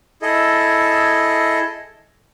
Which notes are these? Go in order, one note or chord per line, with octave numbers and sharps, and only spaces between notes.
E4 G#4 A4 D#5